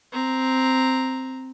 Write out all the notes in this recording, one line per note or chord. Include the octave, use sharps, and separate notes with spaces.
C4 A#5